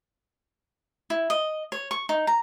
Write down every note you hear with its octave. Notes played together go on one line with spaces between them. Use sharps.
E4
D#5
C#5
C#6
D#4
A#5